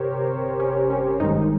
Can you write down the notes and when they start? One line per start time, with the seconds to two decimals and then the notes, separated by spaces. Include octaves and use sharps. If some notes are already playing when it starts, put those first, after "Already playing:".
Already playing: G1 C3 G4 A#4 C5 C#5
0.60 C#4
0.90 C#4
1.20 G#1 G2 D#3 G#3 D#4